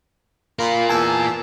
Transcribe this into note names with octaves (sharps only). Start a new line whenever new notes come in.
A#2 F4 A#4 F5 B5
E2 G#5 A5 E6